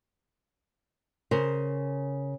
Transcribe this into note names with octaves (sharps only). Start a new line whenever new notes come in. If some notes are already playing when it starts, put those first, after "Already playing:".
C#3 A#4 C5